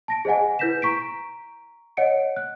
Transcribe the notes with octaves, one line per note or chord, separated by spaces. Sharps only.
A5 A#6 D7
G#4 C5 D#5 F#5 G#5
E4 B4 G6 A#6 B6 E7
A#5 C#6 B6 D7
C#5 D#5 F#5 C#7 D7
F#6